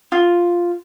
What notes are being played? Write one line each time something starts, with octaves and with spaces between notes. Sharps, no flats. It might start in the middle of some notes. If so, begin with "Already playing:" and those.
F4